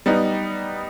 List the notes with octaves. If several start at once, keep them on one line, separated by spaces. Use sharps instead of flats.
G3 B3 D#4